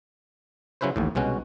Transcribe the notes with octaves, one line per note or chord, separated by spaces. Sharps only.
C#3 F#3 C#4 E4 B4 C5
A1 D#2 A2
C2 B2 G#3 C#4 F#4